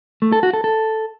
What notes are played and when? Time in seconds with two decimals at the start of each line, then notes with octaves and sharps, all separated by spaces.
0.22 A3
0.32 A4
0.43 F#4
0.53 A4
0.64 A4